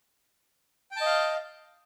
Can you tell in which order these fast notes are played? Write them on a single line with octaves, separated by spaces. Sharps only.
G5 A5 D#5 F5